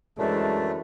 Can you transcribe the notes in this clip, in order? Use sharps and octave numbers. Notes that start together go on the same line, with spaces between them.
F#2 E3 G#3 A3 D4